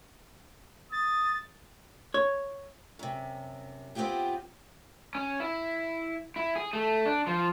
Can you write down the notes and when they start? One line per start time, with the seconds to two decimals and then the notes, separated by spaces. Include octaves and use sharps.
0.92 D#6 A6
2.14 C#5
2.99 F#2 C3
3.95 B3 C4 D#4 F4 G4 G#4
5.15 C#4
5.40 E4
6.36 E4
6.56 G#4
6.73 A3
7.06 D4
7.27 F3